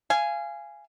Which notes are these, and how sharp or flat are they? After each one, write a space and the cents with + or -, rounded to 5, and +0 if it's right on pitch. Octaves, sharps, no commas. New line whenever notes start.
F5 -25 G#5 +0